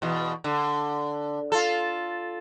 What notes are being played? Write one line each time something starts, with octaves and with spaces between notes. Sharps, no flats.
E2 B2
D3
F4 A4